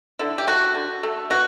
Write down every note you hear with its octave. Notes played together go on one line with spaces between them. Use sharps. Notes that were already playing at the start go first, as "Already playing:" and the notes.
D3 E4
G4
A3 F#4
D3
A3
B2 F#4